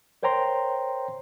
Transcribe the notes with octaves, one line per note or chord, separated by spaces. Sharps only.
A#4 C5 C#5 G5 A#5 C6